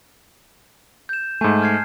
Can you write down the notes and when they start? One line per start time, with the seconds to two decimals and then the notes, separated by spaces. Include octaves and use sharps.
1.09 G6 E7
1.41 G#2 A3 G#5 A5 G6
1.62 F6 G#6 C7